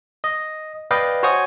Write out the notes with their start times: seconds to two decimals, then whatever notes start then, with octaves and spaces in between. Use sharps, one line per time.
0.24 D#5
0.91 B4 D5 D#5 F5 G5
1.23 F#4 C5 C#5 G#5 C#6 D#6